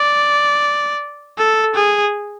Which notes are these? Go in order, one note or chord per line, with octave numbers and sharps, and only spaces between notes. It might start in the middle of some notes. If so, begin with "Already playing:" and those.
Already playing: D5
A4
G#4